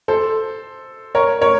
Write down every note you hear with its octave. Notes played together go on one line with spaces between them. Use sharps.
A4 C5
A#4 C#5
A#4 C#5